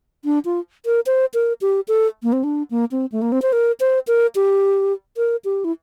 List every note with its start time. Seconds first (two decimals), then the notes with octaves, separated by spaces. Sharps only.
0.25 D4
0.45 F4
0.86 A#4
1.06 C5
1.34 A#4
1.61 G4
1.88 A4
2.23 A#3
2.33 C4
2.44 D4
2.71 A#3
2.91 C4
3.12 A3
3.22 A#3
3.32 C4
3.42 C5
3.53 A#4
3.80 C5
4.07 A#4
4.35 G4
5.17 A#4
5.45 G4
5.64 E4